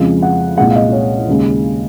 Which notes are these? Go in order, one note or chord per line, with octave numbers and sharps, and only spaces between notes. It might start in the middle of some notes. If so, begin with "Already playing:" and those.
Already playing: F2 C#3 F3 G#3
F#5
C2 A#2 G#3 F#5
F5
D#5
C#5
D#2 C#3 G#3